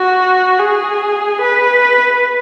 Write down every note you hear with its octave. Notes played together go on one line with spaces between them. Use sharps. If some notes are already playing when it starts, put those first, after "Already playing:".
Already playing: F#4
G#4
B4